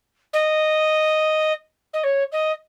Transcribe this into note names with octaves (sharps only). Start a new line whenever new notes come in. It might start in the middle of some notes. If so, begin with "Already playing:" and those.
D#5
D#5
C#5
D#5